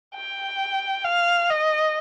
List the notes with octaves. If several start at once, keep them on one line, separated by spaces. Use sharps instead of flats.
G5
F5
D#5